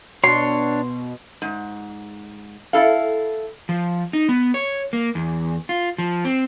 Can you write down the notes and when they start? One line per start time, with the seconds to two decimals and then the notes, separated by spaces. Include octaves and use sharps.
0.24 B2 D4 C#5 C6
1.42 G#2
2.73 E4 A4 F5
3.69 F3
4.13 D#4
4.29 B3
4.54 C#5
4.93 A#3
5.15 E2
5.69 F4
5.98 F3
6.25 C4